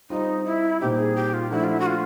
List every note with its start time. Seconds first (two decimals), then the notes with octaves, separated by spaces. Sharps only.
0.10 G3 C4 D#4 F4
0.46 E4
0.81 A#2 G3 C4 D#4 G4
0.98 G#4
1.16 G4
1.34 F4
1.51 F3 A3 D4 E4 F#4
1.64 F4
1.69 E4
1.80 F#4
1.86 F4